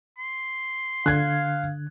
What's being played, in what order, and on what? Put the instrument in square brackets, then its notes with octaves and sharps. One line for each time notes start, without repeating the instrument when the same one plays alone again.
[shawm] C6
[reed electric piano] D3 [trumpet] F5 [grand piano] F#6 G#6